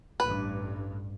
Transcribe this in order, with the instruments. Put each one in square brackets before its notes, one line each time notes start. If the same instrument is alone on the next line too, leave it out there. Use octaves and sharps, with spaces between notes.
[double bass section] A1 G2 [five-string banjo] B4